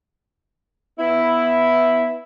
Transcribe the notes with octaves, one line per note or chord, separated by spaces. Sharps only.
B3 E4